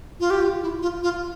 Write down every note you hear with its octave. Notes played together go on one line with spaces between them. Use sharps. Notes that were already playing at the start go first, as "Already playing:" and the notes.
F4
G4
F4
E4
F4
F4